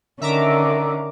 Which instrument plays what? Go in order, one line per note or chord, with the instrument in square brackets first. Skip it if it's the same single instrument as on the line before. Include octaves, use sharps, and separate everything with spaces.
[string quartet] D3 D#3 C#4 [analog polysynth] E5 A#5 D6